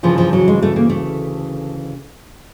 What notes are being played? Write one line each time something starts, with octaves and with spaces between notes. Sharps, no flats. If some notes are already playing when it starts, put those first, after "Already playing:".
D2 C#3 E3 F3
F3
F#3
G#3
A3
A#3
A3